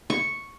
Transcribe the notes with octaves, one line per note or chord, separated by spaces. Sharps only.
C#6